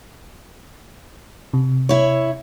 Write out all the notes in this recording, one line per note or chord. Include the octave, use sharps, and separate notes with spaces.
C3
E4 C#5